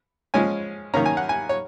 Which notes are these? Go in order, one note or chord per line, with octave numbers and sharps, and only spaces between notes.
F3 G#3 C#4 G#5
D#3 A#3 C#4 A#5
G#5
F#5
G#5
C#5